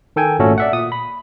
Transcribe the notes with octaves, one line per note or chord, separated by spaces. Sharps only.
D#3 A4 G5 G#5
G#1 A#2 A3 C#4 F#4 A4
D5 E5 F#5
A#2 D#6
B5